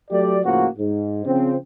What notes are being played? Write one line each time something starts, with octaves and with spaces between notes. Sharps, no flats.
F#3 A3 G4 D5
A2 C#3 F3 A#3 F#4
G#2
C#3 F3 C4